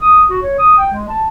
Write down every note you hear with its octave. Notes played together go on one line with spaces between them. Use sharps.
D#6
F#4
C#5
D#6
G5
G#3
A5